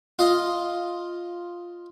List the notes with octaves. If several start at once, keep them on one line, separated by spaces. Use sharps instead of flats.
F4 D#5